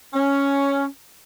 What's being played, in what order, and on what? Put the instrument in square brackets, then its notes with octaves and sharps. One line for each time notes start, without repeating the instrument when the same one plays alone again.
[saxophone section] C#4